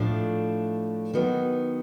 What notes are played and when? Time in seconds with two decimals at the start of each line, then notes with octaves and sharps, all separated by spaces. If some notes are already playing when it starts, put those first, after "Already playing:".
Already playing: A2 F3 A3 D4
1.13 D#3 F#3 B3 D#4